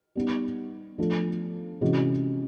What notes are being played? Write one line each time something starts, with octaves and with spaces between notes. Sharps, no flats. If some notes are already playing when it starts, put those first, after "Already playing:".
G3 B3 D#4
F3 A3 D4 F4 A4
C3 E3 G#3 C#4 F#4